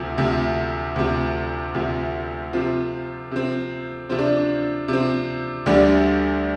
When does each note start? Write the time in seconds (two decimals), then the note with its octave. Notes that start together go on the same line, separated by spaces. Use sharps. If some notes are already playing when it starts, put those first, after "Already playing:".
Already playing: D2 C3 F3
0.18 D2 C3 F3
0.96 D2 C3 F3
1.74 D2 C3 F3
2.53 C3 F3 C4 F4
3.31 C3 F3 C4
4.09 C3 F3 C4 F4
4.19 D4
4.37 D4
4.88 C3 F3 C4
5.66 D2 D3 G3 D4